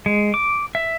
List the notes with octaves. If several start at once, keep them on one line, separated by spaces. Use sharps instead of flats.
G#3
D6
E5